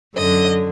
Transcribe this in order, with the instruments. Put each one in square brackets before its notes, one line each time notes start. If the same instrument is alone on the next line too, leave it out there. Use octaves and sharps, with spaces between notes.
[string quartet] F#2 D3 D#5